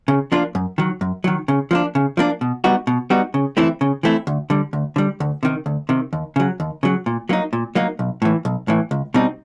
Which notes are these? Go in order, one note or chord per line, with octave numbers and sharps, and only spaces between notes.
C#3
F3 A#3 D4 F4
F#2
D#3 F#3
F#2
D#3 F#3
C#3
F3 A#3 D4
C#3
F3 A#3 D4
B2
G3 B3 D#4 F#4
B2
G3 B3 D#4 F#4
C#3
E3 A3 C4 E4
C#3
E3 A3 C4 E4
D2
D3 G3
D2
D3 G3
D2
C3 D#3
D2
C3 D#3
D#2
C#3 F#3
D#2
C#3 F#3
A#2
F#3 A#3 D#4
A#2
F#3 A#3 D#4
B1
A2 E3
B1
A2 E3
C#2
B2 G3 C4 D#4